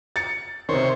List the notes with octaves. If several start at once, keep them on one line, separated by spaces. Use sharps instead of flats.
A6 C#7
C3 D#3 C5 C#5